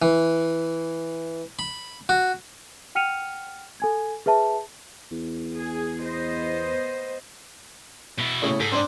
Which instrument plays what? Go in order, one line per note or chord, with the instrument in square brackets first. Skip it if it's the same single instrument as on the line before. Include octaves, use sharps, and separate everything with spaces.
[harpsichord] E3
B5
F#4
[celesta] F#5 G5 F6 C#7 D#7 F7
A4 G#5 G#6
G#4 B4 E5 A5
[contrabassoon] E2
[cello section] G#4
B3 C5 D#5
[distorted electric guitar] B2 E4
[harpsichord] A2 C#3
[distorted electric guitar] G#2 [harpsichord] A4
[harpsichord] C4 D4